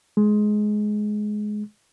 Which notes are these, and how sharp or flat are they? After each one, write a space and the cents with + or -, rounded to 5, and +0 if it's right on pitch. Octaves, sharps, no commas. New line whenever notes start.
G#3 +15